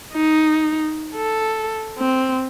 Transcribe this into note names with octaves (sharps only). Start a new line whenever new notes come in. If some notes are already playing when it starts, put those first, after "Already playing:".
D#4
A4
C4